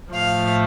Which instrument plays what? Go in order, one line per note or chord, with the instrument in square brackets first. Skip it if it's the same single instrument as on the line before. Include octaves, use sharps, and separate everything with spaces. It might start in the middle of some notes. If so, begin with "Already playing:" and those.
[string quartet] A2 F3 A3 F5